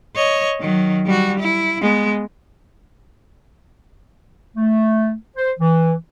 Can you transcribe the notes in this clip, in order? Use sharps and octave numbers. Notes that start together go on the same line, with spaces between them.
C#5 D#5
D#3 F#3
G3 F#4
E4
G#3 B3
A3
C5
E3